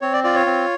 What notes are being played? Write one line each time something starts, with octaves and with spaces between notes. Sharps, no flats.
C4 C#5
D5
F4 D5
C#5
C4